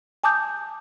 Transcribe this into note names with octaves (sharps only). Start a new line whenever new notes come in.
G#5 A5 D6 D#6 G6